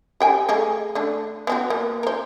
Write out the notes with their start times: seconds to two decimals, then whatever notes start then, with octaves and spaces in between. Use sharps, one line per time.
0.20 G4 G5 G#5
0.49 A3 G#4 D#5
0.95 A3 D4
1.47 B3 C4 F#4
1.70 A#3
2.03 A#4 C5